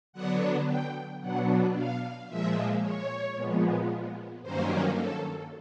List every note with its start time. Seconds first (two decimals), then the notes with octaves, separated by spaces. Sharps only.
0.13 D3 F#3 B3 D4 F#5
0.67 G5
1.21 B2 F#3 B3 D4 F#5
1.74 F5
2.28 A#2 F3 G#3 E5
2.81 C#5
3.35 A#2 F3 G#3 B3
4.42 G2 D#3 F#3 A#3 C#4 C5
4.96 A4